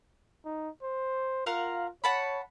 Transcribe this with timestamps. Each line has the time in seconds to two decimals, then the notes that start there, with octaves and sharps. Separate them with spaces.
0.45 D#4
0.83 C5
1.46 F4 A#4 F5 F#5
2.04 C#5 F#5 A5 B5